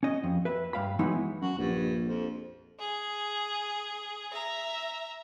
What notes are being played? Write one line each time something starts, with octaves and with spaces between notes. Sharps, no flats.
C#4 D#5
F2
B4 E5
G2 F5 B5
E3 F#3 G#3 B3 D#4 E4
F#2 F#4
A#1 G2
F2
G#4
E5 A#5